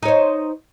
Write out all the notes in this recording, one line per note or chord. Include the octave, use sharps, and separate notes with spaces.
D#4 C5 C#5